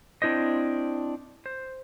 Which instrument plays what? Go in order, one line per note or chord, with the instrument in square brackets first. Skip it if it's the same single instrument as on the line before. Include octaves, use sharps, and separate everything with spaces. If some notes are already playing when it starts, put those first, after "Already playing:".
[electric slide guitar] C4 D4 E4 C5 D#5
C5